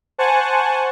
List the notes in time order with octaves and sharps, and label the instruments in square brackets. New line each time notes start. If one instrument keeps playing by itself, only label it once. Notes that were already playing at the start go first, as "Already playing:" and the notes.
[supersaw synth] C5 F#5 G#5 A5 C#6